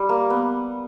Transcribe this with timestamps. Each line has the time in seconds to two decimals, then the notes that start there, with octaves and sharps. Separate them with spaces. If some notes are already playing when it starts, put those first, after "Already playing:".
Already playing: G3
0.09 A#3
0.30 B3